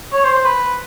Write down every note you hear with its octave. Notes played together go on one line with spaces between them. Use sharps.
C#5
C5
C5
B4